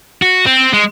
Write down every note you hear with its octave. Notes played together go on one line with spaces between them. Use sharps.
F#4
C4
G#3